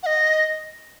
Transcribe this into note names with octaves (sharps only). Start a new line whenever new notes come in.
F#5
D#5